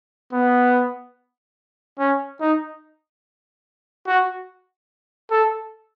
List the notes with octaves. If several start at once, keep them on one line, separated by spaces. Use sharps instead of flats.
B3
C#4
D#4
F#4
A4